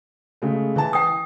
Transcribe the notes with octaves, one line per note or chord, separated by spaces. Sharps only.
C#3 G#3 A3
E3 A5
G5 D#6